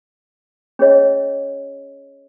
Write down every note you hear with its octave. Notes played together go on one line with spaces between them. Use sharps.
C#4 G#4 C#5 D#5